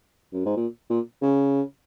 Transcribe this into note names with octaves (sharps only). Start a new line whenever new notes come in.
F#2
G#2
A#2
A#2
C#3